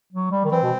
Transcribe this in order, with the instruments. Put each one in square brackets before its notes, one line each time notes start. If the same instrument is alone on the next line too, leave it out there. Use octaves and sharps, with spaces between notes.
[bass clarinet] F#3
G3
D#3
[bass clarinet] E3 [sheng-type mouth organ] C4
[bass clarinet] B2